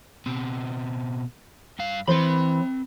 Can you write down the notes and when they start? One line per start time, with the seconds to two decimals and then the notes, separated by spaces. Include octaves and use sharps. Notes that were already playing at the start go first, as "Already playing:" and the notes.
0.26 B2 C4
1.79 G2 F5
2.08 E3 C4 C5 B5